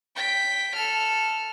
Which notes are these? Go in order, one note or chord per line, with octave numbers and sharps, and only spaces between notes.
G5 B6
A4 F6